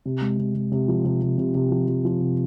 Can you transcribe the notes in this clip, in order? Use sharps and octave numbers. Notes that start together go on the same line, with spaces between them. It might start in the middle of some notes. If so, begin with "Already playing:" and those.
C3
G#3
C3
C3
C3
F3
C3
C3
C3
C3
F3
F3
F3
C3